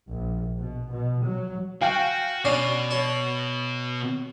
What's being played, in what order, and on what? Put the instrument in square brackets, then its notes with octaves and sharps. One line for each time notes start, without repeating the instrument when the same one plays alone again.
[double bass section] A#1
B2
B2
F#3
[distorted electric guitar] F#4 [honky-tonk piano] F5 G5 G#5
[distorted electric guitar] B2 [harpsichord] C#4 D4 [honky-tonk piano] C7
[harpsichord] F#4 C#5